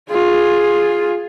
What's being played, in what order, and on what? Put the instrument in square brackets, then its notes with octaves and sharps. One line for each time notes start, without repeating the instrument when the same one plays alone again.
[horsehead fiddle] F4 G#4